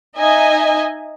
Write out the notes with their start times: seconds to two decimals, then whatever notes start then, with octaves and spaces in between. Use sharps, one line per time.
0.19 D#4 D#5 E5 G#5